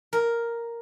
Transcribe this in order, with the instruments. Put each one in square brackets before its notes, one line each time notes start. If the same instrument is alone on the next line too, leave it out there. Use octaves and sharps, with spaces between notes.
[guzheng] A#4